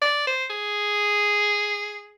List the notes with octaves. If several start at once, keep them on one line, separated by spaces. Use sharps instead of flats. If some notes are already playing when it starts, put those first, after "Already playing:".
D5
C5
G#4